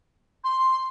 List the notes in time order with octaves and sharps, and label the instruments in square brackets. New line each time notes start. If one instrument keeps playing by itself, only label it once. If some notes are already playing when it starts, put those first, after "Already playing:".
[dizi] C6